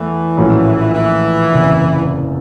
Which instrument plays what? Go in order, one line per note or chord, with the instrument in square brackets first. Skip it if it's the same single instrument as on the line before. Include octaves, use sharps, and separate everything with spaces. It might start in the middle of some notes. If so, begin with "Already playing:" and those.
Already playing: [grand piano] E2 A3 [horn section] E3
[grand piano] A#1 A2 F#3 A3 C#4
[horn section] E3
[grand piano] F#1 E2 C3